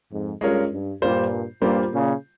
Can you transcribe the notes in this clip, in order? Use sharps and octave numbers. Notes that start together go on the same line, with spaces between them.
F2 G#2
G2 G#3 C#4 F4 A#4 C#5
G2
G2 A#2 G3 A#3 F4 C5
G2 A#2 G3 A#3 F4 C5
A#2 C#3